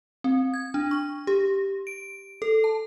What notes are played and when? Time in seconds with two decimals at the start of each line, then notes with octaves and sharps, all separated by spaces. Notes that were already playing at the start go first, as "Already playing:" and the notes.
0.24 C4
0.54 G#6
0.74 D4
0.91 C#6
1.27 G4
1.87 D7
2.42 A4
2.64 A5